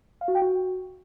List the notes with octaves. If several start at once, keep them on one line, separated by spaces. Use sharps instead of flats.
F5
F#4
G5
F#4